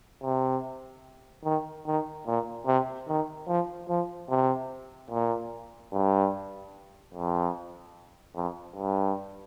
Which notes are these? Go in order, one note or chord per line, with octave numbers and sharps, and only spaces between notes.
C3
D#3
D#3
A#2
C3
D#3
F3
F3
C3
A#2
G2
F2
F2
G2